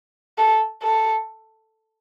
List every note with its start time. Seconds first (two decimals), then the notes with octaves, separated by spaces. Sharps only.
0.38 A4
0.83 A4